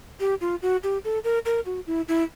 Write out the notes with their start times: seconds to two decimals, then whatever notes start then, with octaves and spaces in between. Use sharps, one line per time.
0.20 G4
0.41 F4
0.62 F#4
0.84 G4
1.05 A4
1.24 A#4
1.46 A#4
1.66 F#4
1.87 E4
2.08 E4